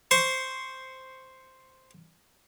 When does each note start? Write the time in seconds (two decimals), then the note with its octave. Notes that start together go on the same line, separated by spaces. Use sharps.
0.11 C5 C#6